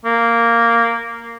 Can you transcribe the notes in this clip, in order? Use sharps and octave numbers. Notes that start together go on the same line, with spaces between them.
A#3